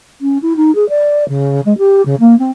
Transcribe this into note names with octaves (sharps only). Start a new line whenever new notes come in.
C#4
E4
D#4
G#4
D5
C#3
G#3
G4
C#3
A#3
C4